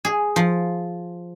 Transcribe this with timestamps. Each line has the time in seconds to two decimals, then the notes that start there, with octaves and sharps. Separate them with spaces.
0.05 G#4
0.36 F3